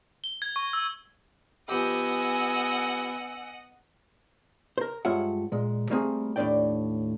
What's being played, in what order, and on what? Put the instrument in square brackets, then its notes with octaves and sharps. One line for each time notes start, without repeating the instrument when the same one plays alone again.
[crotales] G7
G#6
C#6
E6
[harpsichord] F3 G4 [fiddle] B3 [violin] D#5 F#5 [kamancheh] G#5 E6
[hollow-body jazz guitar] A#4 C5
G2 G#3 F4 C#5 E5 F#5
A#2 G#3
G3 A3 A#3 C4 D#4 G#4
D#2 A2 C4 D4 D5 G5